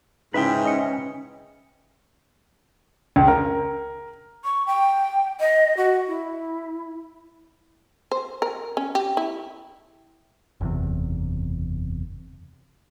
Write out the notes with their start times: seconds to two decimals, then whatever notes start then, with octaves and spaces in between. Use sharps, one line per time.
0.34 G#2 C#3 C#4 D#4 E4 B4 E5 G5
0.65 D#5 C#7
3.16 C#2
3.28 A#4
4.44 C#6
4.67 G5
5.40 D#5
5.77 F#4
6.08 E4
8.11 C5
8.42 A#4
8.77 C#4
8.95 G4
9.17 E4
10.61 F#1 E2 C3